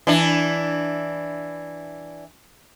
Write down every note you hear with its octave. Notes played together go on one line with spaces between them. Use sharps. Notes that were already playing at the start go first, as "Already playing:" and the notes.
E3 D4